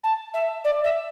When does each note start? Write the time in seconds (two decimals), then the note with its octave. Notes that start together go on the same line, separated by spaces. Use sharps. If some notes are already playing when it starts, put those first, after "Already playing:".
0.04 A5
0.34 E5
0.64 D5
0.84 E5